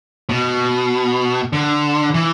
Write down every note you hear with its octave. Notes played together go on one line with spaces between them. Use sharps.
B2
D3
E3